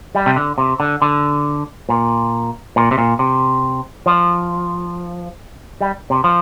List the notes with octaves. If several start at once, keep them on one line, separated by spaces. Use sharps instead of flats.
G3
C3
D3
C3
D3
D3
A#2
A#2
C3
A#2
C3
F3
G3
C3
F3